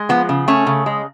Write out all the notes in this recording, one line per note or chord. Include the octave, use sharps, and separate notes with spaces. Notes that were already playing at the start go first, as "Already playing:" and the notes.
Already playing: G#3
F3 B3
C#3
A3 C#4
C#3
G#3